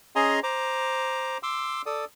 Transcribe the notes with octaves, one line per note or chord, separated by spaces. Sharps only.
C#4 G#4 D#5 G#5 A#5 C6
C5 A#5 D6
C6 D6 E6
A4 D5 D#6